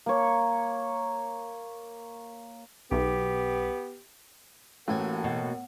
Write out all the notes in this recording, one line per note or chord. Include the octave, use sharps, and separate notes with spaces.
A#3 C#5
B1 B3 G4
A1 A2 A#3 F#4 A4 G#5
B2